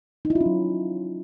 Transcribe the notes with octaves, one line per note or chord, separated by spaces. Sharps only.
D#4
E4
F4
C#4
F#3